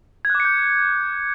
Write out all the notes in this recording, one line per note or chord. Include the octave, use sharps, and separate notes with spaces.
G#6
F#6
D6
C#7
G6